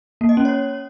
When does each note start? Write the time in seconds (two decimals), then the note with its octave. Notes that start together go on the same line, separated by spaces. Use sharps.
0.21 A#3
0.29 D#5
0.37 C#4
0.45 C#5